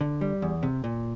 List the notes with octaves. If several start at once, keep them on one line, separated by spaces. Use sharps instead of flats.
D3
G3
E2
C3
A#2